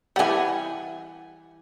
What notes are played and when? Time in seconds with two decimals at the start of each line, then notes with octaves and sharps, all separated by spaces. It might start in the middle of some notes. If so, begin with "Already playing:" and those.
0.16 E3 G3 F#5 G#5